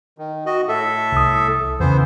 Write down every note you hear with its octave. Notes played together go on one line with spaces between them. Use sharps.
D#3
F#4 D#5
A2 A4 E5
C2 D#6
E2 C#3 E3 B3 C5